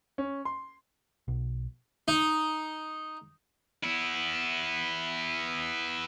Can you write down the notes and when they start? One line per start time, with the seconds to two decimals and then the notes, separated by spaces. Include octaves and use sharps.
0.18 C#4
0.45 C6
1.28 B1
2.08 D#4
3.84 B3 E4